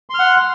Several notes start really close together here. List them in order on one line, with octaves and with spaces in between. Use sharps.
C6 F6 F#5